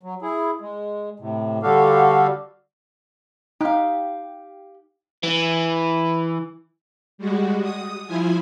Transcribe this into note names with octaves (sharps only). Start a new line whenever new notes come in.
F#3
E4 G#4
G#3
A2 C3
D3 G3 F#4 G4 A4 F5
D#4 G4 F5
E3
G3 G#3 F#4
D#6
F3 E4 F4 G#5